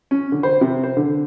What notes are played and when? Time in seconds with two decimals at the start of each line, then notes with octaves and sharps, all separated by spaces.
0.11 C#4
0.32 D3
0.43 C5
0.61 C3
0.83 C5
0.97 D3